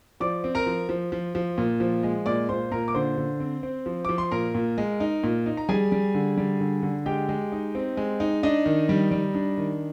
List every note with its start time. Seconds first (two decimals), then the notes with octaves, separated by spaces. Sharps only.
0.20 F3 D5 D6
0.44 C4
0.55 A#4 A#5
0.66 F3
0.89 F3
1.12 F3
1.35 F3
1.58 A#2
1.80 F3
2.03 G#3
2.26 A#2 D5 D6
2.49 A#2 C5 C6
2.72 A#2 A#4 A#5
2.88 D6
2.94 D3 C5 C6
3.17 D3
3.40 C4
3.63 C4
3.86 F3
4.05 F3 D6
4.18 C6
4.31 A#2 A#4 A#5
4.54 A#2
4.78 G#3
5.00 D#4
5.23 A#2
5.46 D#4
5.57 A#5
5.69 G3 G#4 G#5
5.92 G3
6.14 D3
6.38 G3
6.60 D3
6.83 D3
7.06 G#3 G4 G5
7.29 G#3
7.52 D#4
7.75 C4
7.97 G#3
8.20 D#4
8.43 D4 D#4 D#5
8.66 D#3
8.89 G3
9.11 G3
9.35 D4
9.58 D#3